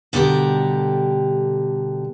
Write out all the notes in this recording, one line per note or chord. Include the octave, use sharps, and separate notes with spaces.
B2 D3 G3 G4 A4 A#4